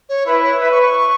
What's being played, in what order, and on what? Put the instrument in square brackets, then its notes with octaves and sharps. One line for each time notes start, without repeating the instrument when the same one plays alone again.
[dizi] C#5
[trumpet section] E4 [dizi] B4
[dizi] C#5
[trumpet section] B4 [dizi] E5
[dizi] C#6
C#6